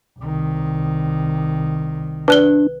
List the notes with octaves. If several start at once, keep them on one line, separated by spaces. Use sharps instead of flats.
C2 D#3
D4 B4 F#6 G7